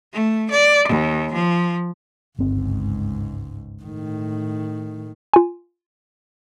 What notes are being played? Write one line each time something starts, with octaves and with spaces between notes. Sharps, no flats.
A3
D5
D#2
F3
G1 C#2 G#2 C4
A2 D#3
F4 G#5